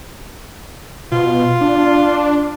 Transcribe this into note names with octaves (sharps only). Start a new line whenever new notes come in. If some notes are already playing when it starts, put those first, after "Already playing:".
B2 F4
D4